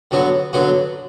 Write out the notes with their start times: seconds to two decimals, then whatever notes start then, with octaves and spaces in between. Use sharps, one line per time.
0.11 D3 F#3 B3 F#4
0.53 D3 F#3 B3 F#4